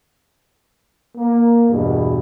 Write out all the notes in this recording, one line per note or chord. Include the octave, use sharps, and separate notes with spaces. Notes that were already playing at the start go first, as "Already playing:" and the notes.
A#3
E2 G2 B2